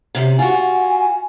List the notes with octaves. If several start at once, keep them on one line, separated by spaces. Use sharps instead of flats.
F#2 C3
F4 F#4 G#5